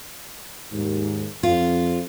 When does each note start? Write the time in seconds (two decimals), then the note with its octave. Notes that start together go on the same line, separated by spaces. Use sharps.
0.72 D#2 G#2
1.43 F2 F4